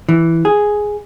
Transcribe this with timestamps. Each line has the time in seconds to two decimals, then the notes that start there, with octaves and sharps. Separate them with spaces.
0.09 E3
0.45 G#4